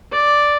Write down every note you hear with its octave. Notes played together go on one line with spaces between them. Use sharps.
D5